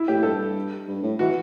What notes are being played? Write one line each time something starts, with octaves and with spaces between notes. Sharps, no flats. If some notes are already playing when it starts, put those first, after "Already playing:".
Already playing: E4
A2 G4
G2 A4
G2
A2
E3 F#4